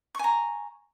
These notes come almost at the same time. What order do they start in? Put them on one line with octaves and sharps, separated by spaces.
C#6 G#5 A#5